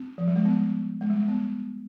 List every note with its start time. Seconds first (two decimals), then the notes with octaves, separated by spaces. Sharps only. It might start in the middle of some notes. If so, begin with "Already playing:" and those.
Already playing: C4
0.18 F3
0.27 G3
0.36 G#3
0.45 B3
1.01 G#3
1.10 G3
1.15 G#3
1.28 B3